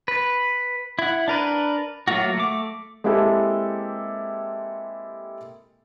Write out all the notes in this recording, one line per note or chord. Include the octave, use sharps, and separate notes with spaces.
B4
E4 F#5
D4 A#4 B4
F#3 A3 A#3 F4 F#4
A3 D6
G#3 A#3 C4 E4 G4 A4